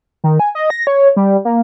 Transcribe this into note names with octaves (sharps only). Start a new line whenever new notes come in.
D#3
G#5
D#5
A#6
C#5
G3
A#3